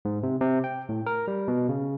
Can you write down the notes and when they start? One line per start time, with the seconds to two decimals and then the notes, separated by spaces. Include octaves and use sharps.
0.05 G#2
0.23 C3
0.41 C3
0.64 G5
0.89 A2
1.06 A#4
1.28 G3
1.48 B2
1.69 C#3